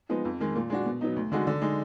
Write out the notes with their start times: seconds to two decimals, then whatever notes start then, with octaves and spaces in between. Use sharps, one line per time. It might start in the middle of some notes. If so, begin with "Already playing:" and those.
0.09 F3 G#3 B3 D#4
0.25 F2
0.40 D#3 G#3
0.55 A#2
0.70 G#3 D4 F#4
0.85 B2
1.01 F#3 B3 D#4
1.16 D2
1.32 D3 G#3 D#4 F#4
1.47 D3
1.62 G#3 D#4